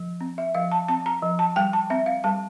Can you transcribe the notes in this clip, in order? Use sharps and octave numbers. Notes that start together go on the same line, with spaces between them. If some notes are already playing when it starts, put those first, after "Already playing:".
Already playing: F3
C4
E5
F3 F5
A5
C4 A5
A#5
F3
A5
G3 G5
A5
C4 E5
F5
G3 A5